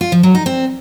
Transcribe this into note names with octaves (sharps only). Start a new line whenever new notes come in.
F4
F3
F#3
D#4
C4